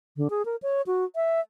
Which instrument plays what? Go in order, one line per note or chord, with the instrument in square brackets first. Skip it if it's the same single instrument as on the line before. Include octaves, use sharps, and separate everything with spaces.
[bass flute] D3
G#4
A#4
C#5
F#4
E5